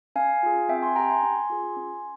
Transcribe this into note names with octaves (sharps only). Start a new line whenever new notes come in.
C#4 F5 G#5
F4 G#4
C4 E5 G5
G#5 C6
G4 G5 A#5
G#5 C6
C#4
F4 G#4
C#4